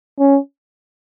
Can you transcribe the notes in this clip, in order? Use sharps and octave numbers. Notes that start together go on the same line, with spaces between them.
C#4